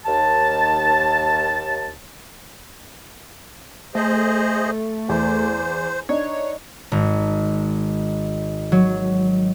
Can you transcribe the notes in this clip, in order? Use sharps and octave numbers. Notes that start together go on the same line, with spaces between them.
D#2 A5
A3 G#4 C5 D#5
E2 C5
D4 D#4 C#5
G#1
F#3